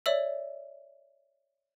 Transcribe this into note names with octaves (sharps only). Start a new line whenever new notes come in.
C#5 D5 E5 E6 F#7